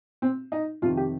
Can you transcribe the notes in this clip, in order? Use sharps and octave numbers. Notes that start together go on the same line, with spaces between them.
C4
D#4
F2 C3 D#3 F4
G4